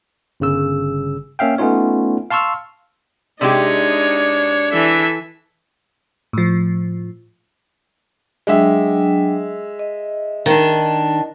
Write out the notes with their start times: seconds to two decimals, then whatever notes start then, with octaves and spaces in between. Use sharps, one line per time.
0.40 G1 C#3 E6
1.39 A#3 C#4 E5 F5 G5
1.58 A3 B3 C#4 D#4 F4 C#5
2.30 F5 A5 C6 C#6 E6 F6
3.41 C3 G#3 D4 D#4 G4 C#5
4.72 E3 A4 E5
6.33 A2 F3
8.47 F#3 G#3 D4 E5 G5
9.79 D#5
10.46 D#3 D4